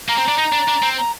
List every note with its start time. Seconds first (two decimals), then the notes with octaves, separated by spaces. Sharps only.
0.08 A#3 A#5
0.18 C4
0.29 D4
0.38 D#4
0.53 D4
0.68 D4
0.83 C4
0.98 A#5